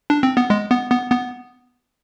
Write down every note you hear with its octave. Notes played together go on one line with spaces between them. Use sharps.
D4
C4
B3
G#3
B3
B3
B3